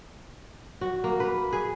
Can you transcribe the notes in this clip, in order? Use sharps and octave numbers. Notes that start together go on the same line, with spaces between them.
F#4
A#3
B4
G#4